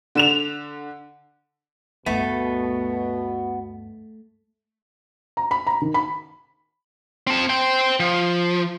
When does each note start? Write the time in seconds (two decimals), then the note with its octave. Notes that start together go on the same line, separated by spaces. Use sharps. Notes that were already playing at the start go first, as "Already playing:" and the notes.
0.15 D3 E7 F7
2.06 D2 G2 B2 A3 B3 A5
5.37 A#5
5.51 B5
5.67 A#5
5.82 D#3
5.94 B5
7.27 C4 A5
7.50 C5 G5
8.00 F3